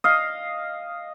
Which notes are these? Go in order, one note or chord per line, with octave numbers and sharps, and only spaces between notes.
D#5 F5